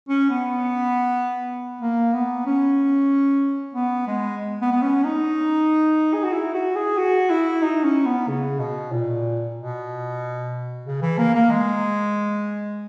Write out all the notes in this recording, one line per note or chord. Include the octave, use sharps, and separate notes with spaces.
C#4
B3
A#3
B3
C#4
B3
G#3
B3
B3
C#4
D#4
G#4
F#4
E4
F#4
G#4
F#4
E4
D#4
C#4
B3
C#3
B2
A#2
B2
C#3
E3
A#3
A#3
G#3